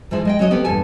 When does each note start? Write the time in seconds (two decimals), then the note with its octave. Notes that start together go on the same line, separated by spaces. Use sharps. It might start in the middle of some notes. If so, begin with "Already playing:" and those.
0.11 G#2 E3 F3 G#3 E4
0.25 G#3 D#5 G5
0.39 F#3 C#4 F#4 C#5 D#5
0.51 B3 C4 G4 A4 B4
0.64 E2 G2 A#2 A4 G#5